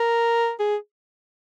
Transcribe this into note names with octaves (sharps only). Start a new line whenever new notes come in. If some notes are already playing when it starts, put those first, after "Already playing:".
Already playing: A#4
G#4